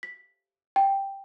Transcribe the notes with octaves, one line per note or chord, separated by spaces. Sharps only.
B6
G5